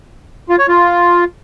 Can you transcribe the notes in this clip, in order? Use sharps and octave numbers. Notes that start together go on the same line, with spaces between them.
F4
C#5
F4